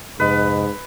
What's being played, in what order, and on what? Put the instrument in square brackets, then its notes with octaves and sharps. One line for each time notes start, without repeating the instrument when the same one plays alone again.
[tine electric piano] F2 C3 D#5 [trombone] G#2 [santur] B4